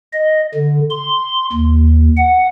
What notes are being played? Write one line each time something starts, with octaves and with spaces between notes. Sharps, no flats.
D#5
D3
C6
D#2
F#5